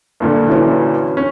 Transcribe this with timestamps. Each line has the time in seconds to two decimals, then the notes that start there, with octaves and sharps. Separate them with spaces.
0.20 G2 A#2 D3
0.47 E3 F#3 C#4
1.17 C#4